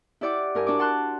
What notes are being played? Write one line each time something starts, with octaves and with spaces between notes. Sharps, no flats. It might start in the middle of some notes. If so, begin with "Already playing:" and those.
E4 G4 D5 F#5 D6
G2 A#4 G#5
D4 F#4 D6
F#5 A5 C6 F#6